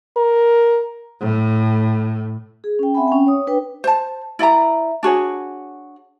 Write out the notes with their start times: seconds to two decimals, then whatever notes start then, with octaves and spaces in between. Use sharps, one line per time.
0.17 A#4
1.21 A2
2.64 G#4
2.79 C#4 G5
2.94 C4 E5 F#5 G#5 B5
3.08 C#4 G5
3.26 C#5 D#6
3.47 D4 B4 G5
3.84 C5 A5
4.39 E4 D5 E5 A#5
5.03 D4 F#4 G#4 C#5